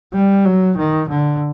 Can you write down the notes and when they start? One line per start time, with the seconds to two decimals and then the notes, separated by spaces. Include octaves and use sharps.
0.14 G3
0.45 F#3
0.77 D#3
1.09 D3